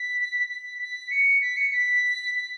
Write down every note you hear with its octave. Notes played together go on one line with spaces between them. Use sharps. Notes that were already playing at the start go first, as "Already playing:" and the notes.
Already playing: B6
B6
B6
C#7
B6
C#7
B6
B6